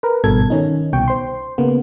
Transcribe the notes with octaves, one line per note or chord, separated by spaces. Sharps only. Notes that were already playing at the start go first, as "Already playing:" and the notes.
A#4 B4
G#1 G2 B2 A4 G#6
D#3 C#4 D#4
C2 B2 G5 C#6
C5 C6
C#3 A#3 B3